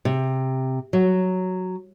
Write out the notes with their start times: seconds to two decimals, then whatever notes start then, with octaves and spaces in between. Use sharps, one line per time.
0.05 C3
0.93 F#3